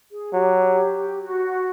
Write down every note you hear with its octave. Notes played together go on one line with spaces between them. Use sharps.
G#4
F#3 G4
F#4